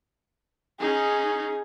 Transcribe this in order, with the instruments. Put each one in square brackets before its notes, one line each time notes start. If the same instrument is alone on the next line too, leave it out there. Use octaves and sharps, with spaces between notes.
[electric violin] C#4 D#4 [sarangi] G#4